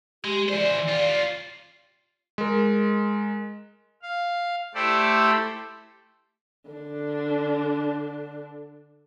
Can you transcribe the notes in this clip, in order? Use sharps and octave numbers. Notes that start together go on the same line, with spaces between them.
G#3 G4
E3 C5 D5
F4 G4
G#3 A#4
F5
A3 E4 G4 A4 C5 D5
D3 D4